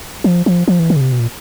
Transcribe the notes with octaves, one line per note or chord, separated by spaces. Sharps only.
F3
F3
F3
E3
D#3
C#3
C3
B2
A#2